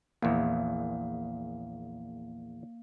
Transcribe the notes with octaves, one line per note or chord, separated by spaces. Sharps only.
A#1 E2 A#3 F5